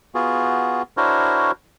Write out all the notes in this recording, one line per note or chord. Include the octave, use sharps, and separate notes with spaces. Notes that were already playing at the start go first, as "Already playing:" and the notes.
B3 F4 F#4 G#4
D4 E4 F#4 A#4 C5 C#5